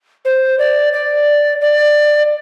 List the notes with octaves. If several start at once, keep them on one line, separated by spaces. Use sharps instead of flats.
C5
D5
D5
D5